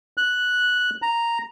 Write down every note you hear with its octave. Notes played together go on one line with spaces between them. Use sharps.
F#6
A#5